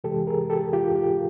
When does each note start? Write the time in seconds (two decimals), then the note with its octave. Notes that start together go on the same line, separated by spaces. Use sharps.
0.04 C3 E3 G#3 G4 A4
0.27 G#4 A#4
0.50 G4 A4
0.73 F4 G4
0.95 F4 G4